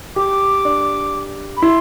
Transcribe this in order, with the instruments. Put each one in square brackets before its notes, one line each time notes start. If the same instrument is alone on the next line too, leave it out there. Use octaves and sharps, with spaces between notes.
[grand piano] G4 [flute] D6
[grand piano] D4
[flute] B5
[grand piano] E4 [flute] C6